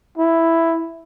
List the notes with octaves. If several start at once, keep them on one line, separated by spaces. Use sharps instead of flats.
E4